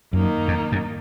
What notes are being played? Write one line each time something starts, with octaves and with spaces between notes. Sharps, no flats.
F#2 D#3 A#3 D#4
F2
F#2